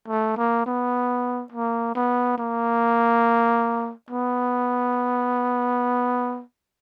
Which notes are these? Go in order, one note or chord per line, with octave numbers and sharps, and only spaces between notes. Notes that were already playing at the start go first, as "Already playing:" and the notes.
A3
A#3
B3
A#3
B3
A#3
B3